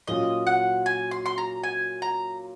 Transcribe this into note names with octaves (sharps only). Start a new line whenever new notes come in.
A#2 F#3 C#4 F4 D#5
F#5
G#5
C6
C6
A#5
G#5
A#5